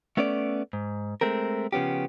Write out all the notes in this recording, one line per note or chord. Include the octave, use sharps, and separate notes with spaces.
A3 B3 C#4 A4 D5
G#2
G#3 A3 C4 A#4
C#3 F3 B3 C#4 G4